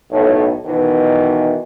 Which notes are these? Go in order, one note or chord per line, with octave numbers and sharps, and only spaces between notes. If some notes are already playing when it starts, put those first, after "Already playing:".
B1 A2
B2 D#3 E3